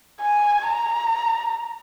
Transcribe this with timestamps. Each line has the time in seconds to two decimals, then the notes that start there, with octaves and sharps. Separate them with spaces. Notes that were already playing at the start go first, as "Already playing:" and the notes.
0.22 G#5
0.68 A#5